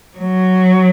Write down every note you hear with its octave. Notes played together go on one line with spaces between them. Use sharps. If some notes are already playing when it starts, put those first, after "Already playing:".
F#3